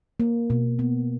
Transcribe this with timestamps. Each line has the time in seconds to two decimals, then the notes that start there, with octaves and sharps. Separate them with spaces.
0.20 A#3
0.50 B2
0.79 B3